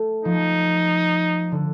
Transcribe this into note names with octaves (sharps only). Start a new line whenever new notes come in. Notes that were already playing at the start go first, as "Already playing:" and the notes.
Already playing: A3
F3 D#4
D3